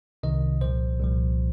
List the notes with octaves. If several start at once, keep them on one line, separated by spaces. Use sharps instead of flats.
C2 C3 D#3 D#5
C2 A#2 F3 C5
C2 A#2 F3